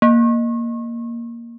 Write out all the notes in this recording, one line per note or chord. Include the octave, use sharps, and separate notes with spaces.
A#3